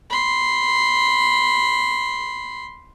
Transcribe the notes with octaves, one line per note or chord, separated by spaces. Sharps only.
B5 C6